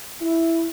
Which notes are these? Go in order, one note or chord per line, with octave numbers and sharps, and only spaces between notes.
E4